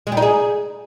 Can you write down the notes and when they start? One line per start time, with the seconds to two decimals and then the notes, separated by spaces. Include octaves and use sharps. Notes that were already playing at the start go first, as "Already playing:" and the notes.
0.07 G#3
0.12 G3
0.17 D#4
0.22 G#4